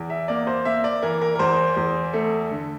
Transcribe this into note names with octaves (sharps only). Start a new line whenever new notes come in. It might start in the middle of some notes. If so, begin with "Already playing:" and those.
Already playing: E2
E5
A#3 D5
C5
A#3 E5
D5
E3 A#4
A#4
A#4
E2 C5
E2
A3 A4
D3